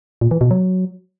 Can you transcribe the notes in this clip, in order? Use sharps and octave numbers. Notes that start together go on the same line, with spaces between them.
A#2
E3
B2
F#3